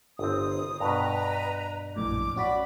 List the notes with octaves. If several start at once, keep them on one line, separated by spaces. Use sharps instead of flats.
G1 C4 D#6
G2 B2 B4 A#5
A#1 F#2 A2 D6
C#4 F#4 D5 B5